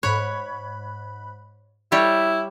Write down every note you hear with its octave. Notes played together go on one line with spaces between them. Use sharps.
G#2 C#5 B5 F#6
G3 E4 G4 C#5 B6